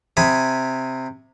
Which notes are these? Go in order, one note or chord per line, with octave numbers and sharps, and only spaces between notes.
C3 G#5 B5 D#6